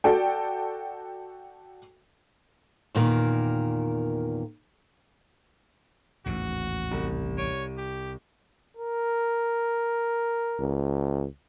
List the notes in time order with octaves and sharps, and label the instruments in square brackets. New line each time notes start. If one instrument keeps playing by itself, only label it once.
[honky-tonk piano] F#4 A4 D5 G5
[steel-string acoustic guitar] E2 A#2 D#3 A#4
[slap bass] A1 D#2 G#2 [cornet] F#4
[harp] C2
[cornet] C#5 [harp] D7 D#7
[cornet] G4
[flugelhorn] A#4
[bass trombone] C#2